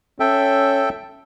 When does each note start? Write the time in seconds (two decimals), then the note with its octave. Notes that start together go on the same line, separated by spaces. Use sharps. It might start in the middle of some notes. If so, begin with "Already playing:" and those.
0.20 C#4 A4 E5 G5